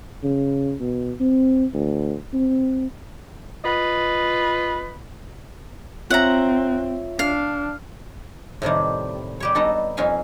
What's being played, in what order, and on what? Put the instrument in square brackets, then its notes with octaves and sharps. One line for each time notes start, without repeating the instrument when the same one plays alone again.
[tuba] C#3
B2
C4
D2
C4
[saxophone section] F4 B4 D#5
[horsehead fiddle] C4 [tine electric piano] F4 C#5 E5 [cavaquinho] F#5 A#5
[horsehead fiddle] D4 [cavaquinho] F5
[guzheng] A2 C3 D#3 G3
G3 G4 C#5
G3 B3 D#4 F#4 A4
F2 C#4 D#4 E5 F5 G#5